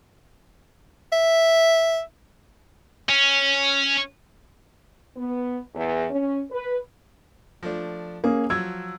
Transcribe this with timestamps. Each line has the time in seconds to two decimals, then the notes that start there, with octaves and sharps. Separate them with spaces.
1.12 E5
3.09 C#4
5.16 B3
5.74 E2
6.10 C#4
6.51 B4
7.63 F3 A3 D4
8.24 A#3 C#4 G#4
8.50 F3 F#3 E6 G#6